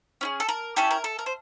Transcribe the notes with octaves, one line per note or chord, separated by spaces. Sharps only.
C#4 E4 G#4
A4
A#4
C#4 E4 G4 A4
A#4
A4
A#4
C5